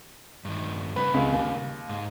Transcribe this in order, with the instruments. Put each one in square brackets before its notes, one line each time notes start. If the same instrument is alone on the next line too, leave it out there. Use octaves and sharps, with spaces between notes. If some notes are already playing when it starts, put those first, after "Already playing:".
[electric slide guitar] G2 D#3
[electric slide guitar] C#3 G3 [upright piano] B4
[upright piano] C#2
D#2
[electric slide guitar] G#2